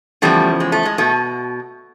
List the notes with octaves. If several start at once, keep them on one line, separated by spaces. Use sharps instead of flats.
E2 C#3 F3 G3 A3
G#3
A3
G#3
B2 A3